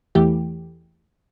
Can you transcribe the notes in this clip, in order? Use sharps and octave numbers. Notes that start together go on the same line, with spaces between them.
E2 E3 A3 G4